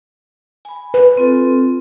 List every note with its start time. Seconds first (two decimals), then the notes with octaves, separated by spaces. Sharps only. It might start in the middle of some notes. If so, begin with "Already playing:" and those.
0.65 G#5 B5
0.94 B4
1.17 C4 F4 A4